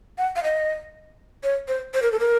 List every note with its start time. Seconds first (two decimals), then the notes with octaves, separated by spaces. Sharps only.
0.18 F#5
0.36 F5
0.43 D#5
1.44 C#5
1.68 C5
1.94 C5
2.02 A#4
2.12 A4
2.20 A#4